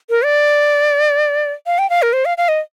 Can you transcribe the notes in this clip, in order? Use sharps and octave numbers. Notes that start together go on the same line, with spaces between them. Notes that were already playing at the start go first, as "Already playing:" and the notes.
A#4
D5
F5
G5
F5
A#4
C5
F5
F5
D#5